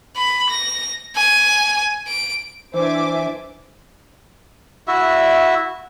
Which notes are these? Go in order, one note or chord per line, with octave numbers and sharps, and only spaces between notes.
B5
A#6
G#5
D7
E3 D4 C5 E5 G#5 D6
E4 F#4 E5